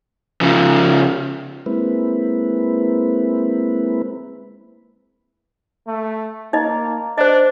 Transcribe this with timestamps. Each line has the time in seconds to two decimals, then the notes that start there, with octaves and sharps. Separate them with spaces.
0.41 C#3 F3
1.66 G#3 A#3 C4 E4 B4
5.87 A3
6.53 A#3 D#4 D#5
7.18 D4 C5 D#5